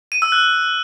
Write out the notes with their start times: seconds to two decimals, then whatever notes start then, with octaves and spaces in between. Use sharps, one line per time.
0.12 D#7
0.22 E6
0.32 F#6